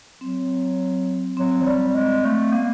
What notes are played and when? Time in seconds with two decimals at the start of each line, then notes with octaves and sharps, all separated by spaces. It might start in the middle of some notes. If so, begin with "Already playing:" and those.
0.21 F#3 C4
1.37 F#3 C4
1.62 F#3
1.66 G3
1.95 G#3
2.25 A3
2.53 A#3 B3